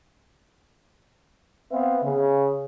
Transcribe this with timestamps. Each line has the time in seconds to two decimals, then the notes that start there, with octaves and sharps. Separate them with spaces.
1.71 B3 C4 B4 E5 F5
2.03 C#3